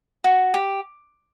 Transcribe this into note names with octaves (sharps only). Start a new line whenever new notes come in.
F#4
G4